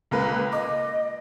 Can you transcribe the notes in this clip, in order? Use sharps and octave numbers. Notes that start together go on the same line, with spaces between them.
C#2 A#3 B4
D#5 D6